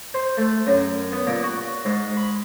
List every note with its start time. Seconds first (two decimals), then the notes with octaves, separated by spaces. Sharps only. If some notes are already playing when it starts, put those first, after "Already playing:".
0.14 C5
0.37 A3
0.67 F#2
1.12 B3
1.27 A#2
1.43 F#4
1.85 G#2
2.17 B5